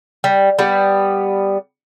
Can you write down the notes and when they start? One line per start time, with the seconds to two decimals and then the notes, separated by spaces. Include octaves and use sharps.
0.24 G3
0.59 G3 B3